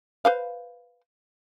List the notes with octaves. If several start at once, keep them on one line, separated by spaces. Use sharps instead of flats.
B4 C5 F5